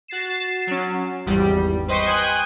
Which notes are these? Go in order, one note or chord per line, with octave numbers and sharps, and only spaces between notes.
F#4 A6 C7 E7
F#3 C#4
G#1 E2 G3
B4 C5 D#5 G5 C6 C#6
G5 G#5 D#6 F#6